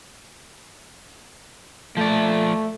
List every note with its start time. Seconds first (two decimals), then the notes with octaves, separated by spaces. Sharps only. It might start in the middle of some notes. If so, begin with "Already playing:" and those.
1.97 F3 A3 D5